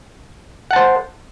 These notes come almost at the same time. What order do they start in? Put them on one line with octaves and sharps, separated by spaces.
F#5 A5 C5